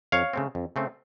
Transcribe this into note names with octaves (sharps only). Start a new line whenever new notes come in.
F2 C#5 F5
C#3 A3 C4
F2
C#3 A3 C4